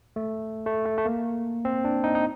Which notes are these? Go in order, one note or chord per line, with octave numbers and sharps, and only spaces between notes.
A3
A3
A3
A3
A#3
C4
D4
D#4
D#4